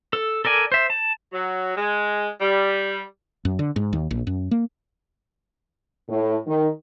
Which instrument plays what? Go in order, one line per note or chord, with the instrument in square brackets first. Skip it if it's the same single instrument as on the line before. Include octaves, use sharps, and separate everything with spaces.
[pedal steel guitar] A4
A4 A#4 D5 G#5
C5 E5
A5
[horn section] F#3
G#3
G3
[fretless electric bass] F#2
D3
G#2
D#2
A#1
F#2
A#3
[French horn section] A2
D#3